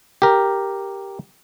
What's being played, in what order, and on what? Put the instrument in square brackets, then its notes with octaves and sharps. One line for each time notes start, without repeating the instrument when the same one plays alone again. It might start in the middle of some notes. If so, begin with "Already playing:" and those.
[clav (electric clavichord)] G4 A#4